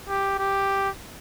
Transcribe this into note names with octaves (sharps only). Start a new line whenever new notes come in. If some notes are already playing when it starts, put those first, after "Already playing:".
G4
G4